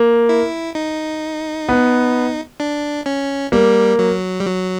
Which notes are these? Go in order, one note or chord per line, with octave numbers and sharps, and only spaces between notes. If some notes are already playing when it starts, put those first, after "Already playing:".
Already playing: A#3
E4
D#4
B3
D4
C#4
G3 A#3
F#3
G3
F#3